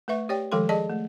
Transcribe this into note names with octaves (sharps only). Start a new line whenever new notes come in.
A3 B4 E5 C#6
G4 C#5 D5 G5
D#3 F3 G#3 A4 G5 C6
G#4 D5 D#5 A5
A3